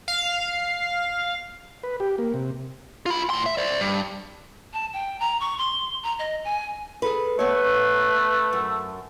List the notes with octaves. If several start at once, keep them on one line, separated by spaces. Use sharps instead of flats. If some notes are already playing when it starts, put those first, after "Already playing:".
F5
B4
G4
A#3
C3
F4 B5
A2 C6
E5
C5 D5
G2
A5
G5
A#5
C#6
C6
A#5
D#5
G#5
G#4 A4 B4
A3 B3 B4 C#5
F#2